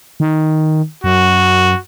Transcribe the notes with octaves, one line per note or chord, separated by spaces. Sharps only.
D#3
F#2 F#4